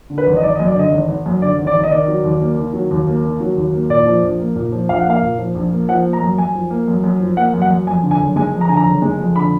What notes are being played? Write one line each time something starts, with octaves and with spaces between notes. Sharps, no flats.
D3
B4
G#1
D#5
G#1 D5
D#5
F#2
D5
D3 D#5
G#1
G#1
F#2
D3 D5
G#1
D5
G#1
D#5
D#3 D5
F#3
D#2
A#3
D#3
F#3
D#2
A#3
D#3
F#3
D#2
A#3
A#2 D5
F3
A#1
A#3
A#2
F3
A#1 F5
F#5
A#3 F5
A#2
F3
A#1
A#3
F3 F#5
A#3
A#5
F#2
F#2 G#5
F3
A#3
F#2
F#2
F3
A#3 F#5
F#2
F#5
F#2
F2 G#5
D3
G#5
F#1
G#3 G#5
F2
A#5
D3 G#5
A#5
F#1
G#3
F2
D3 B5